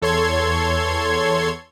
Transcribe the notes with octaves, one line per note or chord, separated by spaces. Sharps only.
E2 A4 C#5 C6 G#6